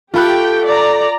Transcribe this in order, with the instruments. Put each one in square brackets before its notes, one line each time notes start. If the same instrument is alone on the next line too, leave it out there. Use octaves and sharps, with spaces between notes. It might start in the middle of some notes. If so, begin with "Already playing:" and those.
[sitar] A3 A4 [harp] F4 B5 F#6 [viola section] G4 G5
[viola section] D5 A#5